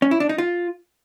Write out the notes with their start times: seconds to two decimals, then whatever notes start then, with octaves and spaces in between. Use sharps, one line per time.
0.02 C#4
0.11 E4
0.20 D4
0.29 D#4
0.38 F4